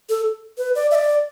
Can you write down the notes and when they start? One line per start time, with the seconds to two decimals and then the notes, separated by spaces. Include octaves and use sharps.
0.09 A4
0.58 B4
0.75 D5
0.91 E5
0.95 D5